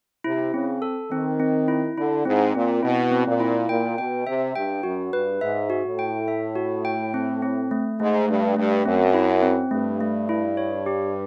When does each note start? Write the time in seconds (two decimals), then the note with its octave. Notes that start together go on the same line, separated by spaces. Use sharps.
0.24 C3 E4
0.54 C#3 C4
0.82 A4
1.11 D#3 C4
1.40 C4
1.68 E4
1.97 D3 E4
2.25 G#2 C4
2.55 A#2 C4
2.83 B2 E4
3.12 C4
3.26 A#2
3.40 E4
3.69 A#2 G5
3.98 B2 G5
4.27 C3 E5
4.55 G2 G5
4.83 F#2 F#4
5.13 G2 B4
5.41 G#2 E5
5.70 F#4
5.85 A2
5.99 G5
6.28 E5
6.55 F#4
6.85 G5
7.14 C4
7.42 C4
7.71 A3
8.00 G#2 A3
8.28 G2 A3
8.56 G2 A3
8.86 F#2 C4
9.14 E4
9.43 C4
9.71 G2 A3
10.01 A3
10.29 E4
10.57 C#5
10.86 G4